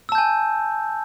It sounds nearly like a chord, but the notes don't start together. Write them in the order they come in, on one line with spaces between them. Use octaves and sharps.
E6 A5 G6 G#5